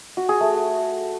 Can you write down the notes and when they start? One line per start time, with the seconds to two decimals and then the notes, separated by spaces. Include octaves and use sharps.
0.17 F#4
0.29 G#4
0.41 A3